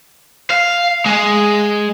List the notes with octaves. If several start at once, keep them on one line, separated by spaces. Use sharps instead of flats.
F5
G#3